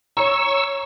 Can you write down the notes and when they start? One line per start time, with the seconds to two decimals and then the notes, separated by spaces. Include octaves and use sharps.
0.17 C#5 A#5 C#6 E6